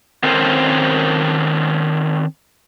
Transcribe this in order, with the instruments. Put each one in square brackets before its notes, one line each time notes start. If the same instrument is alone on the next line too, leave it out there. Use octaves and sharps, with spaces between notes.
[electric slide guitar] D#3 C4 C#4 A4 A#4 C5